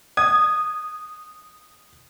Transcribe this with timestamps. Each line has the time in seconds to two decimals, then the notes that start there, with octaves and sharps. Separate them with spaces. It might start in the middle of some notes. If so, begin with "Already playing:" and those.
0.17 D#6 G#6